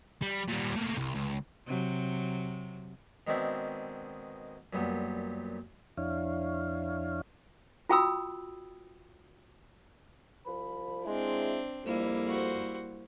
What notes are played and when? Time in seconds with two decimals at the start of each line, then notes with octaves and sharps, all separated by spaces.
0.22 G3
0.48 A#2 G3
0.76 A3 A#3
0.97 C2
1.14 C#2
1.67 C3 F#3
3.27 B2 D#3 G#3 C4 D4 E5
4.73 F#2 A#2 G3 B3
5.97 F2 D4 E4 C#5 F5
7.89 F4 F#4 G5 B5 D#6 E6
10.45 C2 F3 B5
11.05 G#3 C4 D4 E4
11.84 F2 G3 A#3 E4
12.28 F#4 C5